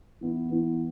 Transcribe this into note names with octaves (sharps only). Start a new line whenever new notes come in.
E3 B3 E4
E3 B3 E4